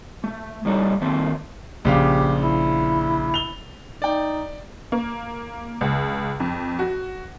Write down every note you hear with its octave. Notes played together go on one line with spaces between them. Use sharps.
A3
A2 G3 D#4 A4 C#5
D#3 A3 A#3 C4
A#1 C#3 G4 F5
E4
F7 G7
D#4 D5 G5
A#3
C#2
F2
F#4